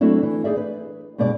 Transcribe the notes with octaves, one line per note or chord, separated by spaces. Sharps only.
F#3 A3 C4 D4 E4
E3
D#4 E4 G#4 D5 E5
B4
G2 B2 G#3 D5